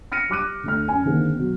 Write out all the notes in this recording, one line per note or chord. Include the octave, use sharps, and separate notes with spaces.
F6 A#6 C#7 D#7
G3 D6 F#6 D#7
D2 A3 F6
F#2 G#5
D3 D#3 A#3 C4 G#4
B2 F#3